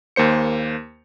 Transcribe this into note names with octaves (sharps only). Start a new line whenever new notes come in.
D#2 A#3 C5 C#7